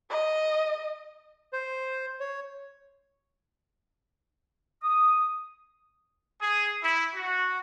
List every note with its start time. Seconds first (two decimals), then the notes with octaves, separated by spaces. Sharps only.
0.10 D#5
1.53 C5
2.20 C#5
4.82 D#6
6.41 G#4
6.83 E4
7.15 F#4